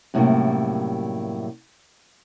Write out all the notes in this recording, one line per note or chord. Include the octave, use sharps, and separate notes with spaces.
F#2 A2 C3 E3 G3 A#3